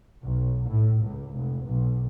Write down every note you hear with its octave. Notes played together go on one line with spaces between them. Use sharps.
B1
A2
C#2
F1
B1